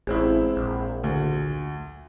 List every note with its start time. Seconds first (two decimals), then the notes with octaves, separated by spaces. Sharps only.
0.07 A1 G#3 C4 E4
0.56 A#1
1.04 D2